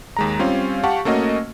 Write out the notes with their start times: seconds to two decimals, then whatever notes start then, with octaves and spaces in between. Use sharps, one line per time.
0.17 D#2 G#3 A#5
0.39 G3 C4 C#4 F4 F5
0.83 G4 F5 F#5 A5 C#6
1.05 A3 A#3 C#4 F#4 D#5